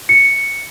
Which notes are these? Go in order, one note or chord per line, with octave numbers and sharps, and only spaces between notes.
C#7